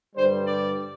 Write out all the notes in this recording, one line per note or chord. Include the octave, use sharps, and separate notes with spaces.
G2 D3 G3 C5
D5